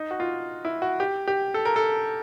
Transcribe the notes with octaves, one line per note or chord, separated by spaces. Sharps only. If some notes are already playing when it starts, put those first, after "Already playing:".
Already playing: D#4
F#4
F4
E4
F#4
G4
G4
A4
A#4
A4